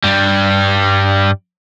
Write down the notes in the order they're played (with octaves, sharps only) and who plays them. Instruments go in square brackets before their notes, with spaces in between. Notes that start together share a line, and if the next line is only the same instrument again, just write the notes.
[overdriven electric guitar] G2 G3